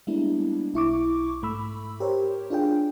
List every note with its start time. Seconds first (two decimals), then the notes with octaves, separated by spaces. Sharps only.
0.07 G3 G#3 A#3 B3 D4 E4
0.74 B1 E4 C#6 D6
1.42 G#2 A3 B5 E6
2.00 G4 A#4 C5 C#5
2.50 D4 F4 G#4 G5